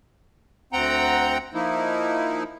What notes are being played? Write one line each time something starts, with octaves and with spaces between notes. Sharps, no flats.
D2 C4 F#5 G5 A#5
F3 A#3 D#4 E4